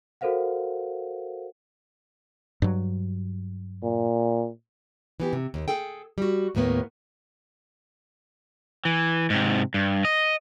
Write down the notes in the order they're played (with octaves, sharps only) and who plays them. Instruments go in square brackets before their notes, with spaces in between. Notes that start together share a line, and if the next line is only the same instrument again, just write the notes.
[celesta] F#4 A4 A#4 C5 F5 F#5
[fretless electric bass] G2 F#3
[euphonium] A#2
[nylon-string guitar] E3 B3 G4
C3
D#2
G#4 A4 G5
G3 F#4
D#2 A2 A#3 B3
[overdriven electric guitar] E3
G#2 C3
G2
D#5